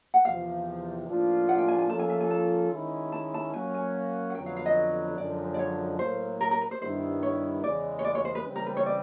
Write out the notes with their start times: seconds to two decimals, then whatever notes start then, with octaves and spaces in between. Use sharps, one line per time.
0.14 F#5
0.25 E2 C3 F3 F5
1.07 A2 F3 A#3 D4 F4
1.49 F#5
1.58 G5
1.68 G#5
1.79 G#5
1.89 F3 A#3 C#4 F4 A4 A5
1.99 G#5
2.10 E5
2.20 G#5
2.31 A5
2.71 D#3 G#3 C#4 E4
3.12 A5
3.34 A5
3.54 F#3 A#3 C#4 F#4 G#5
3.74 G#5
4.30 F#5
4.35 F2 D3 F#3 B3 G5
4.46 F5
4.57 F5
4.66 D#5
5.17 F#2 D3 F3 G#3 D5
5.54 D5
5.59 C#5
5.99 A2 F#3 A#3 C5
6.41 A#4
6.51 A#4
6.61 B4
6.71 C5
6.81 G2 D#3 G3 B3 E4 C5
7.23 C#5
7.63 E2 C#3 E3 G#3 D5
7.99 C#5
8.05 D5
8.15 C#5
8.25 C5
8.35 B4
8.46 C#3 E3 G3 C4
8.56 A#4
8.66 B4
8.77 C#5
8.86 D5